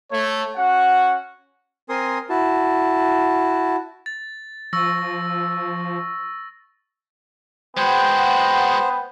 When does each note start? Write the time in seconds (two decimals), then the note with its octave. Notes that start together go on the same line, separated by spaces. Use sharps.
0.12 A3 C#5
0.57 C#4 F#4 F#5
1.89 C4 A#4 G#5 C6 D#6
2.30 E4 F#4 A5
4.06 A6
4.73 F3 C#6 E6 A#6
7.77 G#3 B3 F#4 C5 G5